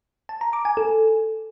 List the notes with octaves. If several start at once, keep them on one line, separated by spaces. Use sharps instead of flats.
A5
A#5
D6
G#5
A4